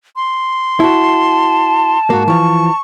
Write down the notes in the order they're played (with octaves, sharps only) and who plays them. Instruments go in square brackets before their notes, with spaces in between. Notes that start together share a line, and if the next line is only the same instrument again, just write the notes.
[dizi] C6
[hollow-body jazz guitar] E4 F#4 [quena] A5
[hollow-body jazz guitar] G#2 A#3 [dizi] F#4
[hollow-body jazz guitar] E3 F3 [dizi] C#6